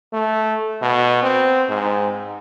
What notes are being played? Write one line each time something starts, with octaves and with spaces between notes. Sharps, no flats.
A3
B2
C4
G#2